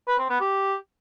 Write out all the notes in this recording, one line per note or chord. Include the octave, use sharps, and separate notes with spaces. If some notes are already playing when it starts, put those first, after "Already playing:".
B4
C4
B3
G4